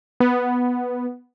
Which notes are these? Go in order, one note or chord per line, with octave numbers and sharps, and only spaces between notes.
B3